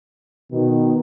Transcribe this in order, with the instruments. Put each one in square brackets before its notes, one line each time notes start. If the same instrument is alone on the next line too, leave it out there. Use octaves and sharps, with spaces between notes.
[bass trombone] B2 [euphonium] D#3